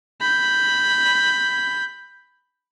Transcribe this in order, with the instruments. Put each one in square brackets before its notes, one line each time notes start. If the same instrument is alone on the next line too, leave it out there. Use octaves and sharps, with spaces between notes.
[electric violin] B5 G6